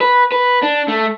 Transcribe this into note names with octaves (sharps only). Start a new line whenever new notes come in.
B4
B4
D4
A3